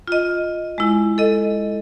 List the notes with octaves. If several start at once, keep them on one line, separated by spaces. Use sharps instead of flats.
F4 D#5
G#3 E4
A4 D#5